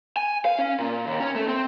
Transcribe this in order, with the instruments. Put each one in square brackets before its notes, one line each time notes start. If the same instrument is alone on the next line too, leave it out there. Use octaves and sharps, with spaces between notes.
[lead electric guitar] G#5
F5
C#4
A#2
D#2
C#4
A3
C4